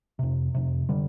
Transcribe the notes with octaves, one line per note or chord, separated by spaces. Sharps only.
F2 C3
F2 C3
D3 G3